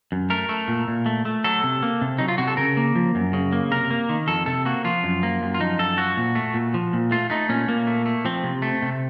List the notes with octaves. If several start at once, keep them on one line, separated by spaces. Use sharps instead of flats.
F#2
A3 A#4
A3
A#2
A#2
A3
A3
F#3 A4
C3
A#3
C3
F#3 D#4
F4
C3 F#4
A4
C#3 A#4
A#3
F3
F#2
C#3
A#3
C3 A#4
A#3
D#3
F2 A4
C3 A4
A#3 F#4
F3 F4
F#2
A#3
F#2
F4
F3 D#4
F#2 A4
F3 F#4
A#2
A3
A#2
F3
A#2
A3 F4
A3 D#4
A#2 C#4
A#2 A#3
A3
A3
F3 C4
C3
A3
C3